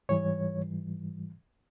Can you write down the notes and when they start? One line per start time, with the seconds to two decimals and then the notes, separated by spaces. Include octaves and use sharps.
0.09 G#2 E3 G3 C#5